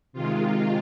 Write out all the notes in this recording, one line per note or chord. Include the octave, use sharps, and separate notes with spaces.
C3 D#3 G#3 F4